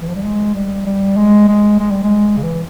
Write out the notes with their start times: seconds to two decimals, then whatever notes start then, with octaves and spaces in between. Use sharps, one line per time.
0.01 E3
0.08 F3
0.15 G3
0.24 G#3
0.55 G3
0.86 G3
1.17 G#3
1.48 G#3
1.80 G#3
1.92 G3
2.04 G#3
2.37 C#3
2.43 E3